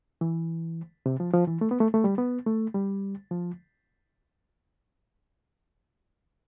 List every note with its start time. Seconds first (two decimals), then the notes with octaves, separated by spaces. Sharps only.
0.21 E3
1.06 C3
1.20 F3
1.34 F3
1.47 E3
1.61 A3
1.71 B3
1.81 A3
1.94 A3
2.04 G3
2.18 B3
2.46 A3
2.74 G3
3.31 F3